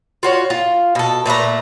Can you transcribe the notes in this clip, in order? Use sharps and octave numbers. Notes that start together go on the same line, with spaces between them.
F4 F#4 C#5
F4
B2 A4
A#2 A3 B4 A#5